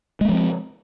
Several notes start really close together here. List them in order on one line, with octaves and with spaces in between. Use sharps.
G#3 A#3 F3 C4